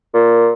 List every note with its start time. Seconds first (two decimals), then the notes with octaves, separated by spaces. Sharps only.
0.14 A#2